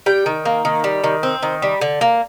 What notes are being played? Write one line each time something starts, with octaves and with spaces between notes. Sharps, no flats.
G3 G5
D#3
A#3
D#3
G3
D#3
C4
D#3
G3
D3
A#3